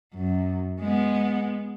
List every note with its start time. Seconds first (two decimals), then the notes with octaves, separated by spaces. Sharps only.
0.14 F#2
0.80 G#3 B3